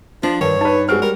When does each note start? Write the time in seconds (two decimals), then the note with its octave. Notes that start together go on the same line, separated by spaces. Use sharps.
0.23 F3 D4
0.41 G2 D#3 C#5
0.61 D#4 B4 A5
0.89 G#3 C4 F#4 F6
1.02 G3 A#4